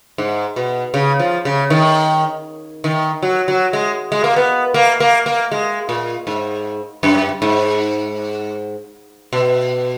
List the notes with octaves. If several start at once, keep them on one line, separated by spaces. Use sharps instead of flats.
G#2
B2
C#3
F3
C#3
D#3
D#3
F#3
F#3
G#3
G#3
A#3
B3
A#3
A#3
A#3
G#3
A#2
G#2
F#2
G#2
B2